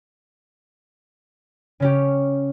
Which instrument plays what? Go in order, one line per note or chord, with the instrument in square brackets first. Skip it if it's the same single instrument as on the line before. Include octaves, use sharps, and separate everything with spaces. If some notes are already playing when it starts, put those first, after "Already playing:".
[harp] C#3 C#4 G4